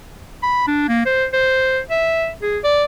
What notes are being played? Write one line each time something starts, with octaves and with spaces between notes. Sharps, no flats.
B5
D4
A#3
C5
C5
E5
G#4
D5